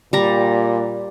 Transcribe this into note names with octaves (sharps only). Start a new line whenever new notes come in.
A#2 G3 A#5